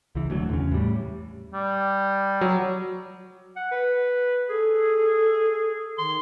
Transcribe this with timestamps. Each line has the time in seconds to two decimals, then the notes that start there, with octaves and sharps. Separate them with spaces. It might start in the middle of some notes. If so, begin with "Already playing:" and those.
0.15 C#2 E3
0.28 D#1 D2 F#3
0.49 E2 C#3
0.72 A2 G3
1.54 G3
2.41 F#3
3.56 F#5
3.71 B4
4.50 G#4 A4
5.98 D#3 C6